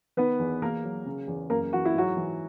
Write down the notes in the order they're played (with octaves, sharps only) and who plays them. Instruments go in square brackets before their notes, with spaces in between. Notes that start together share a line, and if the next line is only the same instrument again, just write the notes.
[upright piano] D#3 B3 B4
E2
E2 A#3 A#4
F#3
C#3
E2
F#2 A#3 A#4
E3 F#4
E4
G#2 F#3 F#4
E3